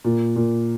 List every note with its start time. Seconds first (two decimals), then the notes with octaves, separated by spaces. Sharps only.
0.04 A#2
0.36 A#2